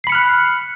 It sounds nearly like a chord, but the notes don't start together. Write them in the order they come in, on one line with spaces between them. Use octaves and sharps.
C7 B5 C#7 F6 F#6